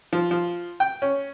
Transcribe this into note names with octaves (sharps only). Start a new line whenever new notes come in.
F3
F3
G5
C#4